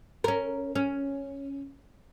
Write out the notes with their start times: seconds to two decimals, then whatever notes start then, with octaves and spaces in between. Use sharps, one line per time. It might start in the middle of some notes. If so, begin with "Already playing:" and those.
0.24 C#4 A#4
0.75 C#4